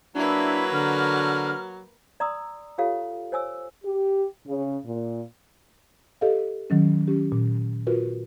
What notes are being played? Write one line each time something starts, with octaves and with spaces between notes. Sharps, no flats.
F#3 A#3 D4 E4 B4
D3 F6
D5 A#5 C6 D#6 E6
F4 G4 A4 C#5 F5
C5 C#5 G#5 E6
G4
C#3
A#2
G4 A4 D#5 F5
D#3 F#3 C#4
C#4 G4
A#2
F4 F#4 A#4 B4